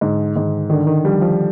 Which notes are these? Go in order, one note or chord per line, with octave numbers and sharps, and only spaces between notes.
G#2 D3
G#2 D#3
D3 D#3
D#3
F3 G3
F3